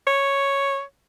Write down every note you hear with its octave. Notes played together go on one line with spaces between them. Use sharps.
C#5